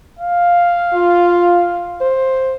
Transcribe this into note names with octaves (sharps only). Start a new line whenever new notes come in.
F5
F4
C5